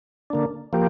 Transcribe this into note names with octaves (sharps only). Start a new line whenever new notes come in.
D3 A#3 D4
F3 A#3 G4